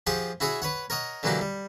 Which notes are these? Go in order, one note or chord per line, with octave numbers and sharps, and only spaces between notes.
F3 G4 G#4 F#5 C6 C#6
E4 F#4 G#4 C#5 E5
B4 C#5 F#5
A#4 C#5 D#5 F#5
D3 E3 F#3 A#3 F#4 G4
G3